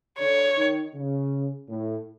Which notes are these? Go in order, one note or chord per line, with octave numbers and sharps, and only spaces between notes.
D3 C#5
D#3
C#3
A2